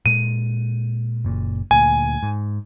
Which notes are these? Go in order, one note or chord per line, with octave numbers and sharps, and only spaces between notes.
A#2 G#3 D#7
F#1 A#2
D2 A#2 G#5
G#2